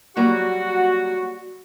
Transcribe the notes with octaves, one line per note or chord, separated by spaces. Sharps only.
F#3 G3 A#3 F#4